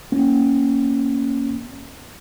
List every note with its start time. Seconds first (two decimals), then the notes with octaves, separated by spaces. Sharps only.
0.12 A#3 B3 C#4